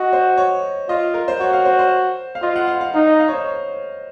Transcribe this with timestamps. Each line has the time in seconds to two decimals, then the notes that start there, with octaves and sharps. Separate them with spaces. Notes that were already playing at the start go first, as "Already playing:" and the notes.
Already playing: F#4 D#5
0.13 C5
0.37 C#5
0.89 F4 D#5
1.14 A#4
1.28 C5
1.40 F#4 C#5
1.53 F5
1.65 C5
1.79 C5
2.35 F5
2.42 F4 D#5
2.56 F#5
2.68 F5
2.81 F5
2.94 D#4 F5
3.07 D#5
3.20 F5
3.28 C#5
3.32 C5
3.45 C#5